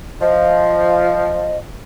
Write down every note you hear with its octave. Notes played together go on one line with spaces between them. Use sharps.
F3 D#5